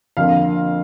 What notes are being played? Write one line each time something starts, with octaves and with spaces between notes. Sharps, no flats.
F2 D3 F3 A#3 F5